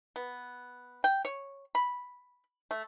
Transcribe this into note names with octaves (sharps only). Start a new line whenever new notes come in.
B3
G5
C#5
B5
A3